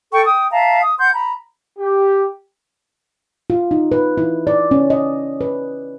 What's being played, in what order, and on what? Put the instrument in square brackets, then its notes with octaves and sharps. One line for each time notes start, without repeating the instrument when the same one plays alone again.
[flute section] A4 G5 C#6
G5 D#6
E5 F5 A5 A#5
D#6
F#5 C6 G6
A#5 B5
[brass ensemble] G4
[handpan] F4
D#4
B4
E4
D5
C#4
D#5
B4